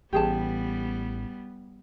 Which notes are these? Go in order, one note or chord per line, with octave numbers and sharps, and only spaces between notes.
A1 G3 B3 G4 G#4 A5